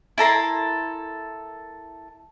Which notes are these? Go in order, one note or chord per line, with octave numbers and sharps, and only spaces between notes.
E4 A4 A#4 C6